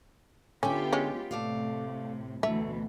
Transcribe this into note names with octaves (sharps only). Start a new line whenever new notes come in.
D3 B3 C#4 F4 G4 E5 G5
G#3 C#4
A2 C3 A3 D5 F5
D2 B2 E3 A3 E5